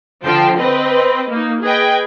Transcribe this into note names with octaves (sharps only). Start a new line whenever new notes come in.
D3 F3 G5 A5 C7
C4 B4 D#5
A#3 D#4
G#4 B4 D#5 G5 G#6